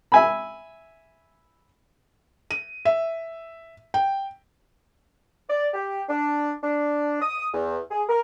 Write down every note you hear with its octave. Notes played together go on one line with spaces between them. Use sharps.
E5 G#5 B5
D#7
E5
G5
D5
G4
D4
D4
D#6
E2
G#4
A#4